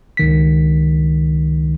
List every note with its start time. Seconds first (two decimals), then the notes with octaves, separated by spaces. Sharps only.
0.17 C#2 D#3 B6